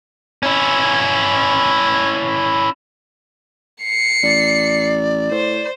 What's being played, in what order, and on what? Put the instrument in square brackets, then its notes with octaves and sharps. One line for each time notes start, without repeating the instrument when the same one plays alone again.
[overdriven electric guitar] C#4 E4
[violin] C7 C#7
[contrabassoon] A1 [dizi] D5
[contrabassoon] A2 [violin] C5